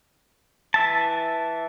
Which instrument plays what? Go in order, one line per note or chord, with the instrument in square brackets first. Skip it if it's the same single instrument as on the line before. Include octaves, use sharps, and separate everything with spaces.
[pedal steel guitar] E3 E5 A5